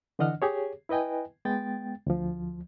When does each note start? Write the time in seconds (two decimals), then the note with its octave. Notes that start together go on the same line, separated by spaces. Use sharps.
0.19 D3 E3 D4 D#5 F#5 F6
0.42 G4 G#4 C#5
0.89 E4 B4 D#5 G5 G#5
1.45 G#3 B3 G5 A6
2.07 D2 F3